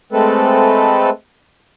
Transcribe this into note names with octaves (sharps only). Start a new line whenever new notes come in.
G#3 A3 C4 A4 B4